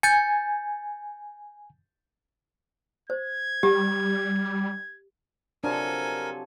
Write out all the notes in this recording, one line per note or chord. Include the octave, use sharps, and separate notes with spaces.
G#5 G6 A6 C#7
C5 G#6
G3 G4
C3 F3 F#3 D4 A4 A#4 G#5